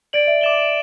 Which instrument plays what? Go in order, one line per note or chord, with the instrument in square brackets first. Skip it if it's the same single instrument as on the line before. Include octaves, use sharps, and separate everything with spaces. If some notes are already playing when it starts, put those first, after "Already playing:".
[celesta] D5 [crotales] A6 D7 F#7
[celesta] E5
[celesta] E5 [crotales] D6 A6 E7 G7
[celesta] E5